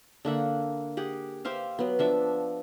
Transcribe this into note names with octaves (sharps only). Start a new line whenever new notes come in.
D3 A#3 E5 F#5
G4 G#4 F#5
G4 C5 E5 F5
F#3 B3
F3 D4 E5